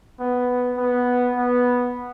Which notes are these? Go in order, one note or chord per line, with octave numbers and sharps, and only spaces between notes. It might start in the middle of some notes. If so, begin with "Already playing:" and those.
B3
B3
B3